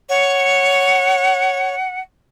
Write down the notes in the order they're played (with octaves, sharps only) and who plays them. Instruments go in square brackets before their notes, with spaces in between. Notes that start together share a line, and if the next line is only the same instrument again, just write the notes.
[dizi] C#5 [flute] F#5